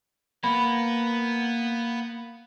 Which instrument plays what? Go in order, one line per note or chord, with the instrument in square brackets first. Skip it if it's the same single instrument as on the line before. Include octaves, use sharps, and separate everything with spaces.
[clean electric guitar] A#3 [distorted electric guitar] B3 [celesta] B5